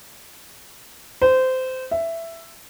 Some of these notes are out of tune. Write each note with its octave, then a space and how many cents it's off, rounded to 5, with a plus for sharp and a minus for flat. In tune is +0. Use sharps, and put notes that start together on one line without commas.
C5 -20
E5 +10